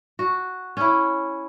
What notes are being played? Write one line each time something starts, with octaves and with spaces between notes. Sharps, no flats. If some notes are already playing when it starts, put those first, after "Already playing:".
F#4
C#4 E4